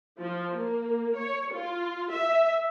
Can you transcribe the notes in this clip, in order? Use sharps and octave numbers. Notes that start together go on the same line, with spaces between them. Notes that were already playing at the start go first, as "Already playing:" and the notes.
F3
A#3
C#5
F4
E5